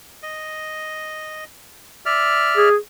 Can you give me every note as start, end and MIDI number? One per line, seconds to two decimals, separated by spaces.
0.23 1.44 75
2.06 2.69 74
2.06 2.69 76
2.06 2.69 89
2.57 2.76 68